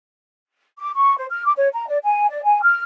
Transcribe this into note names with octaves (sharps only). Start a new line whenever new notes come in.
D6
C#6
C5
F6
D6
C#5
A#5
D5
G#5
D5
G#5
F6